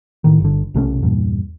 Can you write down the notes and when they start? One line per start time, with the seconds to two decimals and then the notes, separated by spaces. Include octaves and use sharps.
0.24 A2 D#3
0.40 G1 D3
0.74 B1 C3 A3 C#4
1.02 E2 G2 A#2